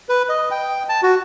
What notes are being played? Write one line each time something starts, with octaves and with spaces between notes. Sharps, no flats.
B4
D#5
G5
A5
F#4